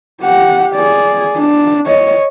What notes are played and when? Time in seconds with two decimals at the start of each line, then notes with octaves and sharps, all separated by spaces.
0.22 G4 F#5
0.75 G#4 D5
1.38 D4
1.86 C#5 D#5